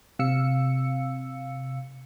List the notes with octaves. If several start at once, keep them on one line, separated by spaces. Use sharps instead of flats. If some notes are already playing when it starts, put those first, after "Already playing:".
C3 F5 E6 C#7